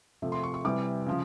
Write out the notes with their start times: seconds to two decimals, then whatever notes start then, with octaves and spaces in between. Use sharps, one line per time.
0.22 C3 F3 A3
0.32 C6
0.43 C#6
0.54 C#6
0.64 C3 E3 G3 D6
1.06 C#3 F3